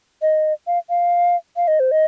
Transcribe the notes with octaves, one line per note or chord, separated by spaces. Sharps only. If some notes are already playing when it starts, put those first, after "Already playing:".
D#5
F5
F5
F5
D#5
C5
D#5